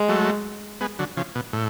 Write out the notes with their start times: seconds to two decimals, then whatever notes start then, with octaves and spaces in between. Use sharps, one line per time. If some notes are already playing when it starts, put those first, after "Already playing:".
Already playing: G#3
0.09 F#3 A3
0.81 G#3 B3
0.99 D3 F#3
1.17 C#3 F3
1.35 B2
1.53 A2